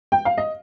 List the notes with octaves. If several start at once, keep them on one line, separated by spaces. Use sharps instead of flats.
G5
F5
D#5